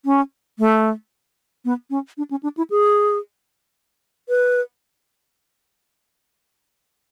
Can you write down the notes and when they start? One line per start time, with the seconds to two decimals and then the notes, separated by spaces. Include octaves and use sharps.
0.05 C#4
0.59 A3
1.65 B3
1.90 C#4
2.18 D4
2.31 C#4
2.43 D4
2.57 E4
2.70 G#4
4.29 B4